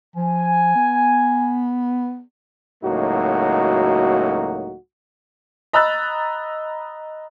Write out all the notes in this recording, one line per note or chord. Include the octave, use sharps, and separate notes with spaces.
F3 G#5
B3
C#2 A2 F#3 A#3 D#4 F#4
D#5 A#5 B5 E6 F#6 A6